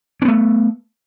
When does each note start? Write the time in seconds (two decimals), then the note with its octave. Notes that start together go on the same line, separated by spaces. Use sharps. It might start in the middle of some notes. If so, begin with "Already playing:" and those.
0.22 C#4
0.25 B3
0.28 A3